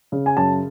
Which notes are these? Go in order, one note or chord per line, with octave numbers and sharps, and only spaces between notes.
C#3
G#5
F#2 A5